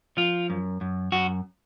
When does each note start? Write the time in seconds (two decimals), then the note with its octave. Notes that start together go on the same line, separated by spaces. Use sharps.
0.17 F3 F4
0.50 F#2
0.81 F#2
1.12 F#2 F#4